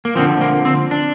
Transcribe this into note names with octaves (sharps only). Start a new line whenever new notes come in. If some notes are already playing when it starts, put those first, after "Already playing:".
A#3
D3 F3 C4
A#3
C4
D4